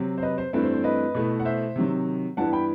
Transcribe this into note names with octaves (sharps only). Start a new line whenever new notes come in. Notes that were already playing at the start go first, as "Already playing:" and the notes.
Already playing: C3 F#3 C4
C5
B4 D#5
C5
G2 E3 A3 C4 B4
C5
C5
B4 D#5
B2 A3 E4
F#5
C5 E5
C3 D#3 F#3
G2 E3 B3 E4 F#5 A5
G5 B5